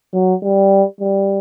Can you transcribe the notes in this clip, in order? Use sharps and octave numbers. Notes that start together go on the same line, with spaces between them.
F#3
G3
G3